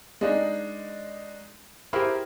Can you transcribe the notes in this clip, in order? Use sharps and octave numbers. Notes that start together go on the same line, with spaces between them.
G#3 D4 D#4
E4 G4 G#4 A#4 C5